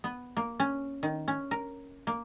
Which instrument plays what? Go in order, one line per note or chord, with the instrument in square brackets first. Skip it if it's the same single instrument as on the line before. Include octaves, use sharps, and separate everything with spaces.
[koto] B3
A#3
C#4
D#3
C#4
A#4
A#3